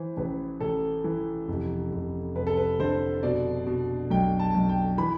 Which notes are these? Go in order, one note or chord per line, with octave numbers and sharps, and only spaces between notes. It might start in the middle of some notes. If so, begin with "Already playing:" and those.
Already playing: E3 C5
A1 B4
A1 A4
E3
F1
F1
F1 B4
A4
B4
D3 C5
B2 D5
B2
B1 G5
A5
B1
G5
E3 B5